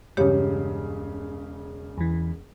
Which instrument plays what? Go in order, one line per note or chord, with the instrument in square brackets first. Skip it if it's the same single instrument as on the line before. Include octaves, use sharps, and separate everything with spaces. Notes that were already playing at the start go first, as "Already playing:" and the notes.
[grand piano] E1 C#3 [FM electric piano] G2 [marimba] G4 C#5
[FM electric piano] E2 E3